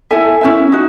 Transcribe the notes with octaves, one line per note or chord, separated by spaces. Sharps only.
E4 A4 E5 G#5
C#4 E4 B4 E5
D#4 F#4